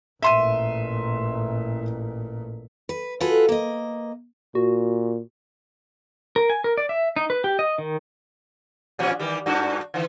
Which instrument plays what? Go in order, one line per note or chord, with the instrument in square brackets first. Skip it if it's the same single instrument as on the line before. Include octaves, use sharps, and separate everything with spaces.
[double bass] A1 A#2 [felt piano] E5 C6 D#7
[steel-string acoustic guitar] B4
F4 F#4 G#4 A4 B4
A#3 D#5
[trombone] A#2 [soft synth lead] F#4
[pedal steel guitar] A#4
G#5
A#4
D5
E5
D#4
B4
G4
D#5
D#3
[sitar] A#2 F3 C#4
D#3 E3 G3
G2 D4 F#4
D3 E3